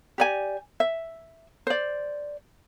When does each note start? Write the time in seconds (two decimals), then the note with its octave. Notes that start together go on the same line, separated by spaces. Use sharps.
0.18 G4 D5 G#5
0.80 E5
1.67 C5 D5